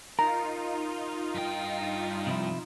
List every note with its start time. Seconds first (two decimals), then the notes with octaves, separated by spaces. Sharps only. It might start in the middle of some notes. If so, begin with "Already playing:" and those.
0.19 D#4 F4 A#4 A#5
1.35 G2 G5
2.27 C3 F3 E4